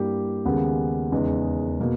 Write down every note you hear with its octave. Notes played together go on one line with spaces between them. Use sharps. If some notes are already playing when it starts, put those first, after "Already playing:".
Already playing: G2 G3 A#3 E4 G4
D#2 C#3 G#3 B3 G4
E2 C#3 G#3 D#4
B2 A#3